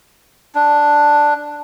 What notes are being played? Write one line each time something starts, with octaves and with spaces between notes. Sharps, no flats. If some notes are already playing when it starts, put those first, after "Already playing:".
D4